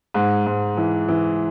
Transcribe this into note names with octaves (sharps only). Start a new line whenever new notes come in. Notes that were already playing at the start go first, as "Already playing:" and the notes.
G#2
G#2
E3
E3